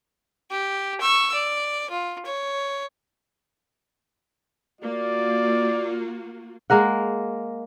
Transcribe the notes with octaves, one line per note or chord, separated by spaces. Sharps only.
G4
C#6 E6
D5
F4
C#5
A#3 F4 F#4 D5
G#3 A#3 A#4 F#5